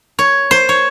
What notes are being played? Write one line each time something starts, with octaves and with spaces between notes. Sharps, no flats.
C#5
C5
C#5